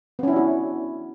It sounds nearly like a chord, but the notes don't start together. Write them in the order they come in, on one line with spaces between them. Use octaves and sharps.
B3 C#4 E4 D4 F#4